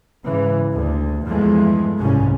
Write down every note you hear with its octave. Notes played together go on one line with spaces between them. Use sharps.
G#2 C#3 E3
D2
E2 G2 E3 F3 G#3 A3
F#1 C2 G#2 F3 G3 C#4